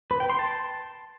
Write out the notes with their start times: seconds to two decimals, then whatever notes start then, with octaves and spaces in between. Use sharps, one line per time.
0.11 B4
0.20 G5
0.30 C6
0.39 A5